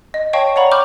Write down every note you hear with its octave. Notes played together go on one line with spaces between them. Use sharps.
D#5
C#5 D#5 F5 G5 A5 C#6
C#5 D5 F#5 A#5 B5 C#6
A#5 B5 C#6 D6 F6 G6